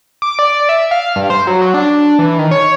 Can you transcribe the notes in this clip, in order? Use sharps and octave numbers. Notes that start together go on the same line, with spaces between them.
D6
D5
E5
F5
G2
C5
F#3
F#3
D4
E3
D#3
C#5